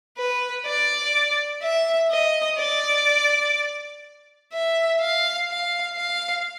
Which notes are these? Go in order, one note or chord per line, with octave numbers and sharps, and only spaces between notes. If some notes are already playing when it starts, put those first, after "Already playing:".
B4
D5
E5
D#5
D5
E5
F5
F5
F5